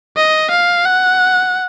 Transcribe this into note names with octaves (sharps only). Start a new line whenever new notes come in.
D#5
F5
F#5